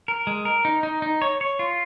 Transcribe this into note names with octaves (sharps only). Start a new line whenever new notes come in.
A#4
G#3
A#4
D#4
D#4
D#4
C#5
C#5
F4